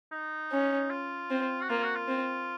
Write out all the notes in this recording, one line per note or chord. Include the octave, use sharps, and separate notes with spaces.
D#4
C#4
F4
C4
F#4
A#3 F4
F#4
F4
C4